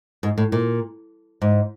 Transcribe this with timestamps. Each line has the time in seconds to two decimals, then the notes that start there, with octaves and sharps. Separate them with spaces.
0.23 G#2
0.38 A2
0.52 A#2
1.42 G#2